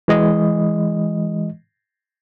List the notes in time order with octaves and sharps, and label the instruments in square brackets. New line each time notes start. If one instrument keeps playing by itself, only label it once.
[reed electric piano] E3 G#3 D#5